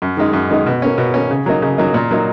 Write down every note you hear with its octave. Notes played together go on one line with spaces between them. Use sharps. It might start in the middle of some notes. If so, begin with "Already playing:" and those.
F#2
D#3 G#3 D#4
F#2
D#3 G#3 D#4
B2
A#3 C#4
B2
A#3 C#4
C#3
F#3 A#3 D#4
C#3
F#3 A#3 D#4
A#2
F#3 A#3 D#4